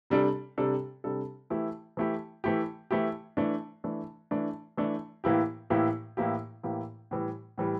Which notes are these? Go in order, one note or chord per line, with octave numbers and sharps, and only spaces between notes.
C3 G3 D4 A4
C3 G3 D4 A4
C3 G3 D4 A4
E3 A3 E4 G4
E3 A3 E4 G4
E3 A3 E4 G4
E3 A3 E4 G4
E3 A3 D4
E3 A3 D4
E3 A3 D4
E3 A3 D4
A2 E3 A#3 E4 G4
A2 E3 A#3 E4 G4
A2 E3 A#3 E4 G4
A2 E3 A#3 E4 G4
A2 E3 G3
A2 E3 G3